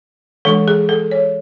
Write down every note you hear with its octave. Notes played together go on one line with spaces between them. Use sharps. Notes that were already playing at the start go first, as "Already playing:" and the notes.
E3 G#3 D4 A4
G#4
A4
C#5